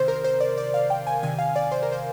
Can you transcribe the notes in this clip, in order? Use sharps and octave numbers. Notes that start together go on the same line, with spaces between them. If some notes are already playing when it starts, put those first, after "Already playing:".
Already playing: C3 D#3 C5
A#4
C5
D5
D5
F5
G5
G#5
C3 D#3 G#5
F5
D5
C5
A#4
C5